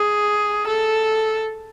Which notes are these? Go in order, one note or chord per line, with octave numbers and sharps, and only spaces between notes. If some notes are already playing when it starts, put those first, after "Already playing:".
Already playing: G#4
A4